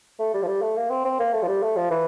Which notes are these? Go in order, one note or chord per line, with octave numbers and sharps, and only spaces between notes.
A3
G3
F3
G3
A3
A#3
C4
C4
A#3
A3
F3
G3
A3
F3
E3